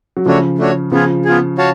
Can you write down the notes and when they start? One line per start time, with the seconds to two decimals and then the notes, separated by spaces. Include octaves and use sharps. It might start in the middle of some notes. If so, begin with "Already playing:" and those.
0.17 F#3
0.26 C#3 F3 A3 D4 F#4 C#5
0.59 A3 D4 F#4 C#5
0.92 C#3 F3 B3 F4 G#4
1.25 B3 F4 G#4
1.58 F#4 C#5 F5 A5